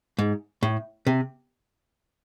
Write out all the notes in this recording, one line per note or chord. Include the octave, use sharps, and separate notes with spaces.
G#2
A2
C3